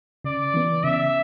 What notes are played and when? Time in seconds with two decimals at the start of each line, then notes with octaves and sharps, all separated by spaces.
0.24 C#3 D5
0.54 E3 B3
0.83 C#3 E5